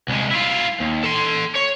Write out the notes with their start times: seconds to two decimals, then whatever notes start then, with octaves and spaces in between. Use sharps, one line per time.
0.08 C2 G#3
0.31 E4 F4
0.80 D#2
1.03 A4 C6
1.56 C#5